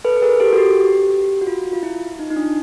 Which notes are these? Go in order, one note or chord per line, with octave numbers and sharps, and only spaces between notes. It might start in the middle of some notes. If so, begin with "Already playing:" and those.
A4 B4
B4
G#4 A#4
G4 A4
F#4
G4
F#4
F4
F4
E4
D#4
D#4
D4